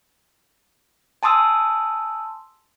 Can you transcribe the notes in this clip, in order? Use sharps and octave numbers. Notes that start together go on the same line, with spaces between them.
G#5 A5 C6 D#6 E6